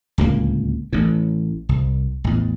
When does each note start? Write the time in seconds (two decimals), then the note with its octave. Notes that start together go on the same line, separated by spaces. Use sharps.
0.18 D1 C#2 B2 A#3
0.93 A1 A2
1.69 C2
2.24 A1 E2